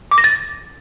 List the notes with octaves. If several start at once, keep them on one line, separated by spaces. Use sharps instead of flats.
D6
A#6
A6